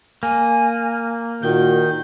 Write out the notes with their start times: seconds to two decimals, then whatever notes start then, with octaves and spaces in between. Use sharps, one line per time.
0.23 A#3 G#5
1.42 A#2 D#3 F#4 A#4 G6